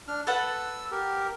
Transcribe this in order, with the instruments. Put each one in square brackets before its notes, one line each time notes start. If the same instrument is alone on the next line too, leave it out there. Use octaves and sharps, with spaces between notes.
[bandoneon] D4 F6
[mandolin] A4 B4 F#5 [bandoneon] E6
[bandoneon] G4 A#4